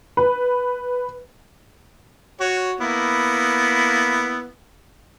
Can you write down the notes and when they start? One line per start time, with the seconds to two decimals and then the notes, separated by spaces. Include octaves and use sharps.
0.17 B4
2.41 F#4 C#5
2.81 A#3 B3 E4